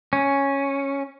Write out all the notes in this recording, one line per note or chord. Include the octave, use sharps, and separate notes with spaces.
C#4